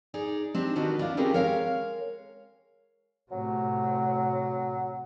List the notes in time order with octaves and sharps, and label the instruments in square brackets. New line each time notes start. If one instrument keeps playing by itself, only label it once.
[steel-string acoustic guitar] D#4 G#4 D5
C4 D4 D#4 G4
D#3 D4 F#4 A#4 B4 D#5
D4 E4 F4
C4 C#4 D#4 G4 G#4 A#4
G#3 A#4 C#5 F5
[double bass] A2 C3 [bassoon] F#3